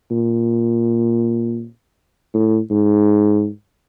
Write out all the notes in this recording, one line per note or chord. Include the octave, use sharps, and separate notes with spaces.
A#2
A2
G#2